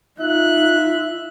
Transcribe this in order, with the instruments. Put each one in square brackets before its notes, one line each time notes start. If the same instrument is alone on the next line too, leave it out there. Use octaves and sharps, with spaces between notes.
[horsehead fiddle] D#4 F4 [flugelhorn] E5 [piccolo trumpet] F#6